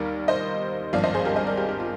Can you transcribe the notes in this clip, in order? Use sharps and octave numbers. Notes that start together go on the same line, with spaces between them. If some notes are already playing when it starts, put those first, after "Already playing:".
Already playing: D#2 D#3 G3 A#4 D5
C5 D#5
G#1 G2 F3 D5 F5
C5 D#5
G#4 C5
G4 A#4
C5 D#5
A#4 D5
G4 A#4
G4
F4